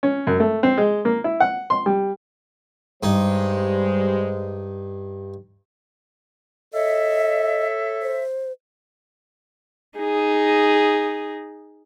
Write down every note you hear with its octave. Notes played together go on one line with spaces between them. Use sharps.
C#4
F#2
A3
C4
G#3
A#3
E4
F#5
C6
G3
G2 G3 G#3 D#4 C5
A4 C#5 D#5 E5
C5
D#4 G#4